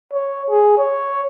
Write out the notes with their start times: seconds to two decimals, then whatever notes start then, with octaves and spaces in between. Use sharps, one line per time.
0.13 C#5
0.49 G#4
0.78 C#5